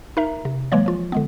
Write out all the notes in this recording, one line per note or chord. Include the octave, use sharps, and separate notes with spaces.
D#4 A#4 E5 A#5
C3
E3 F#3 G#3 A#3 C#5
F3 F4
D3 G#3 B3